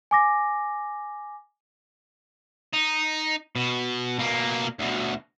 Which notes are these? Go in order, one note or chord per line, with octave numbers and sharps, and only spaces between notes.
G#5 D6 A#6
D#4
B2
B2 A#3
D2 B2